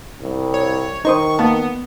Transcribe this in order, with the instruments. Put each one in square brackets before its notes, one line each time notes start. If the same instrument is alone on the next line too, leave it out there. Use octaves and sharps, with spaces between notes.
[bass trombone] C2
[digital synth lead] C#5
[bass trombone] D#3 [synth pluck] D#4 C5 D#6 [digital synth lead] C#6
[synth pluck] A#3 A5 [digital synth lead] B3